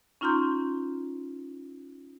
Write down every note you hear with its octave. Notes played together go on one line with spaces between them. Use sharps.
C#4 D#4 F4 A#5 C6 G6